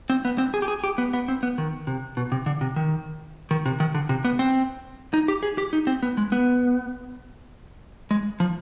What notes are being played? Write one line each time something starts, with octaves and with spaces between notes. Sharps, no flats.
C4
B3
C4
G#4
G4
G#4
G4
B3
B3
C4
B3
D#3
C3
B2
C3
D3
C3
D#3
D#3
C3
D#3
D3
C3
B3
C4
D#4
G4
G#4
G4
D#4
C4
B3
G#3
B3
G#3
F3